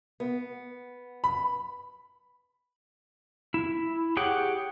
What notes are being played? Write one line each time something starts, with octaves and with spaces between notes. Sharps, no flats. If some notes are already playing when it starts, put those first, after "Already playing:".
B3
B5
E4
G4 G#4 C#5 F#5 G5